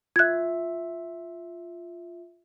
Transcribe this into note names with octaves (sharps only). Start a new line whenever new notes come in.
F4 E5 F#6 G#6